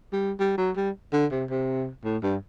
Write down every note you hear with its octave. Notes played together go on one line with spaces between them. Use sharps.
G3
G3
F#3
G3
D3
C3
C3
A2
G2